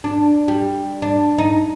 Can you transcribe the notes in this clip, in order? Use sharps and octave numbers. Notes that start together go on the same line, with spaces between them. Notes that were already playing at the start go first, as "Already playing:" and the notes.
D4
G3
D4
D#4